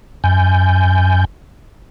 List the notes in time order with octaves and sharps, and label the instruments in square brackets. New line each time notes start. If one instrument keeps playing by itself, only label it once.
[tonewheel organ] F#2 G#5 G6